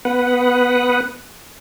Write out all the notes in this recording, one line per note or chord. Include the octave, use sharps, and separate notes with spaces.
B3 B4 F#5